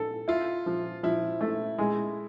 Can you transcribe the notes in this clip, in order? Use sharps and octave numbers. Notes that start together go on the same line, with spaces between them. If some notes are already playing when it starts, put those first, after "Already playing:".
Already playing: A4
E4 F4
F3
F3 E4
A3
G#3